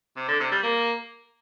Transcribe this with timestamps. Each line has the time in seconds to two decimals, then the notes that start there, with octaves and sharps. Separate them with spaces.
0.17 C3
0.28 D3
0.40 C3
0.52 G3
0.63 A#3